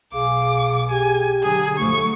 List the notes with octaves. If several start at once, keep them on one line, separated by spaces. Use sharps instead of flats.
B1 G#4 F5 D6
G4 G#5
D3 F#3 G#4
F#3 A3 C#6